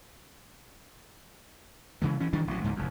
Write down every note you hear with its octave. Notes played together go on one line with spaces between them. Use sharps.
C#3 E3 G#3
E3 C#4
D#3 E3 G3 D4
A1 F#3
C#2 G#2 B2
F1 E2